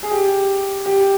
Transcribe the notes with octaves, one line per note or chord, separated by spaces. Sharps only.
G#4
G4
G4